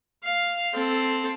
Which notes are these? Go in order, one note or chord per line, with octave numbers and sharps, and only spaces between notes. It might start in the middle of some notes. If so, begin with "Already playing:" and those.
F5
C4 A4